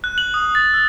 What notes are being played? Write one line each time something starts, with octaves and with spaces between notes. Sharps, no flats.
F#6
F#7
D#6
A6
E6